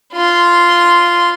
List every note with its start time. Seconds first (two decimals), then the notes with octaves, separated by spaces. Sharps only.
0.13 F4 C6